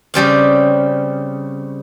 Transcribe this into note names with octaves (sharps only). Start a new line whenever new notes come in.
C#3 G3 C4 F5